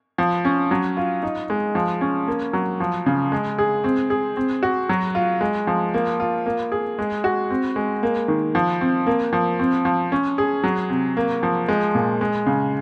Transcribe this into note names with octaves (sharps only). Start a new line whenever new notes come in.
F3
C#4
F#3
F4
D#4
G#3
F3
C#4
A#3
F#3
F3
C#3
G#3
G#4
C4
G#4
C4
F#4
F#3
F4
G#3
F3
A#3
F4
A#3
G#4
G#3
F#4
C4
G#3
A#3
D#3
F3
C4
A#3
F3
C4
F3
C#4
G#4
F#3
C3
A#3
F3
G#3
A#2
G#3
C#3